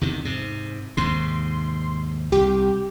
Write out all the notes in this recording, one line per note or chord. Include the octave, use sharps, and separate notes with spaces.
E2 C3 D#3
G#2 C3
D#2 G#2 C3 C6
C2 G4